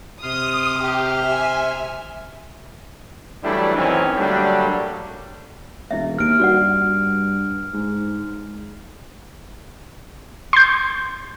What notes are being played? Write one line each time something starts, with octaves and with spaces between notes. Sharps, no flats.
C3 C6 D#6 F6
G4
E5 G#5
E3 F#3 G3 A3 D4 E4
F#2 D#3 E3 C4 C#4
D3 F#3 G3 A3 A#3 D4
E1 E4 D#5 E5
D#2 F6 D7
G2 F#4 D5 F#5
G#2
C6 G6